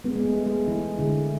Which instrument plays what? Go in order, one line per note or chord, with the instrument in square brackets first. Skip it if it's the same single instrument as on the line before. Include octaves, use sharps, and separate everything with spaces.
[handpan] G#3 [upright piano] B3
[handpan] G#3
A3
[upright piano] G#4
[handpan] G#3
[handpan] E3 [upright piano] E4
[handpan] D3 [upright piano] G#3